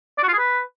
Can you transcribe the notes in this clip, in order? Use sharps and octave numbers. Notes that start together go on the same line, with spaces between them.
D5
F#4
F4
G#4
B4